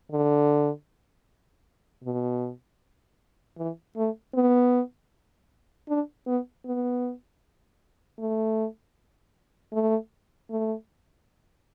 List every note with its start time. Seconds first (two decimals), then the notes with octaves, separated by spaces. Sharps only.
0.12 D3
2.04 B2
3.58 E3
3.96 A3
4.34 B3
5.89 D4
6.27 B3
6.65 B3
8.19 A3
9.73 A3
10.50 A3